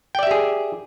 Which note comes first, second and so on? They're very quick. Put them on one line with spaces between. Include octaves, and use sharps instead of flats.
G5 D5 E5 G4 G#4